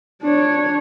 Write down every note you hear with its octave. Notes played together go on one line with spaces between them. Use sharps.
D4 C#5